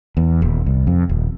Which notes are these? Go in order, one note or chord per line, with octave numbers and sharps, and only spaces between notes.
E2
D#1
C2
F2
D#1